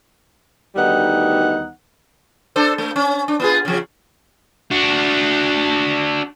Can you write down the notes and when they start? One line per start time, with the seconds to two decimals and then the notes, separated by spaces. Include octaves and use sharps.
0.76 D2 D#3 G3 B3 D#4 F#5
2.56 D4 A4 C5
2.78 A3
2.96 C#4
3.28 D4
3.40 B3 F4 G#4
3.65 C#3 F3
4.71 D4 F#4